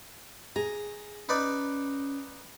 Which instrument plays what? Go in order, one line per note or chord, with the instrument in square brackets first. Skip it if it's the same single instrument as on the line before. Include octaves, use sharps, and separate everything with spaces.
[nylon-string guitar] G#4 [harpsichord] A#5
[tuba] C#4 [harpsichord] D#4 B4 D5